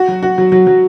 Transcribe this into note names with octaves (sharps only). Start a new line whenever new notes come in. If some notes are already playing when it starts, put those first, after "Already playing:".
Already playing: F#4
F#3
F#4
F#3
F#3
F#3